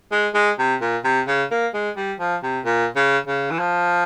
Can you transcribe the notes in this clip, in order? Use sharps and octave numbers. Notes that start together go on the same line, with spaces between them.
G#3
G#3
C3
A#2
C3
C#3
A#3
G#3
G3
F3
C3
A#2
C#3
C#3
E3
F3